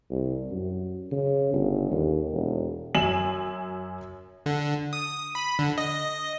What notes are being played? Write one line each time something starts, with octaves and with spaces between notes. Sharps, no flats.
C2
F#2
C#3
G1
D#2
E1
F#2 G#5 E7 F#7
D3
D#6
B5
D3
D#5